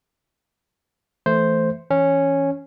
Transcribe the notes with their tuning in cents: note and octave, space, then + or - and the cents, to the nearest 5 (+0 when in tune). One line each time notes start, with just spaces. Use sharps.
E3 +0 A3 +0 C5 +0
E3 +0 C#4 -5